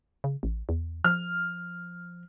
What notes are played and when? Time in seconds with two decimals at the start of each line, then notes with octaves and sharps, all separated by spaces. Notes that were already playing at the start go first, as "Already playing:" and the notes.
0.24 C#3
0.43 A1
0.69 E2
1.04 F3 F6